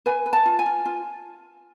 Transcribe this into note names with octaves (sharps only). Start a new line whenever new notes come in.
B4 G#5
B4
A5
F4
G#5
F4
F4